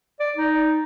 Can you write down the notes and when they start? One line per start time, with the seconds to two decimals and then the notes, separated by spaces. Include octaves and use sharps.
0.20 D5
0.36 D#4